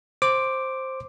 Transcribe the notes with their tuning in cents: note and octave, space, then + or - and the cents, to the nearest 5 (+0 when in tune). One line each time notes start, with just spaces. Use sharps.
C5 +5 D6 +0